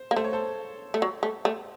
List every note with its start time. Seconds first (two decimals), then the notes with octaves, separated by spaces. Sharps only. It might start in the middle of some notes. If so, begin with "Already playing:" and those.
Already playing: C5
0.11 A#3
0.16 A3 C5
0.24 C#5
0.33 A4 C5
0.94 A3
1.02 F#3
1.23 A3
1.45 A3